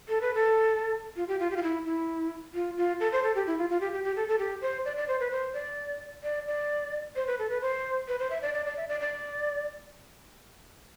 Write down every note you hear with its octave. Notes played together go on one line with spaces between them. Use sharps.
A4
B4
A4
F4
G4
F4
G4
F4
E4
E4
F4
F4
A4
C5
A4
G4
E4
F4
F4
G4
G4
G4
A4
A4
G4
C5
D5
D5
C5
B4
C5
D5
D5
D5
C5
B4
A4
B4
C5
B4
C5
E5
D5
D5
D5
E5
D5
D5